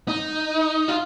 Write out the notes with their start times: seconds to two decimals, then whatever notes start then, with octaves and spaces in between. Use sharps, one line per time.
0.08 D#4
0.88 F4